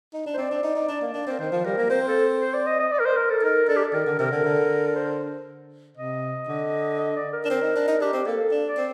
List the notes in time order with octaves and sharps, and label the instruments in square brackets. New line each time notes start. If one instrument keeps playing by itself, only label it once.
[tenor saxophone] D#4
D4
[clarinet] C5
[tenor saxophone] C4 [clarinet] D5
[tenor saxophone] D4
D#4
D#4
D4
A#3
D4
C4
[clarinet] A#4
[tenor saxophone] D#3 [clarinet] C5
[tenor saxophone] F3
[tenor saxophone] G3 [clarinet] A#4
[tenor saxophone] A#3
[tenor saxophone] C4 [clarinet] C5
[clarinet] A4
C5
D5
D#5
D#5
D5
A#4
C5
A#4
A4
[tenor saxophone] D#4 [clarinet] A#4
[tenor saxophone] D4 [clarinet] A4
[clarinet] G4
A4
[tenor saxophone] D#3 [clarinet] A#4
[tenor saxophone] D3
[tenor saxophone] C3 [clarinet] A#4
[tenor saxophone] D3
D3
[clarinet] A#4
C5
[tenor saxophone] C3 [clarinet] D#5
[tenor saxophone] D3
[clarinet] D#5
D5
A#4
[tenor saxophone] D4
C4
D#4
D4
D#4
[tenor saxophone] D4 [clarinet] G4
[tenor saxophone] C4
[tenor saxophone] A#3 [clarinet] A4
[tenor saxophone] D4
[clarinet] D5
[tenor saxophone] C4